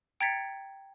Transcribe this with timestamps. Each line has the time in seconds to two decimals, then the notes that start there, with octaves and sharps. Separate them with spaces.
0.21 G5 A#5 G#6 A6 B6 C#7